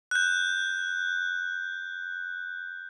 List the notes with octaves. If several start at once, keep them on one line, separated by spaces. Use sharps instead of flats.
F#6 G6